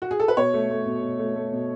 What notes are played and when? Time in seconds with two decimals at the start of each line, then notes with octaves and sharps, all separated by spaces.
0.02 F#4
0.11 G#4
0.20 A4
0.28 B4
0.37 B2 C#5
0.54 A3
0.70 A3
0.86 B2
1.03 B2
1.19 A3
1.36 A3
1.52 B2